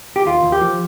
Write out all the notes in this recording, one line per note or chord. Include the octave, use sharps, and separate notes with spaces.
G4
D#2 F4
D#2
G4
F3